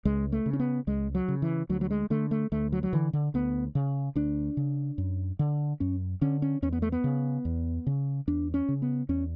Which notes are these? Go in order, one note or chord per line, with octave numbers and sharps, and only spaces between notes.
C#2 G#3
A3
C#3
C#4
B3
C#2 G#3
F#3
C#3
E3
D2 F#3
F#3
G#3
D3 A3
A3
D2 A3
F#3
F#3
D3 E3
D3
D2 B3
C#3
D2 D4
C#3
F#2
D3
F#2 C#4
D3 C#4
C#4
E2 C#4
B3
A3
B3
C#3
E2
C#3
E2 D4
C#4
C#3
B3
E2 C#4